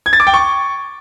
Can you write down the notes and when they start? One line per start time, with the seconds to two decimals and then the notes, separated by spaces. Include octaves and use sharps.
0.06 G#6
0.13 A6
0.20 D6
0.27 G5
0.34 C#6